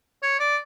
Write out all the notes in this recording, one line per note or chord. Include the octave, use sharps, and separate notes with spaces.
C#5
D5